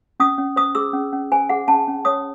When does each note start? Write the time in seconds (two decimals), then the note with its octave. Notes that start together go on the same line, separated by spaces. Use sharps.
0.20 C#4 D#6
0.38 C#4
0.56 C5 D#6
0.75 G#4 E6
0.93 C#4
1.12 C#4
1.32 C5 G#5
1.49 G#4 F#5
1.68 C#4 A5
1.87 C#4
2.05 C#5 D#6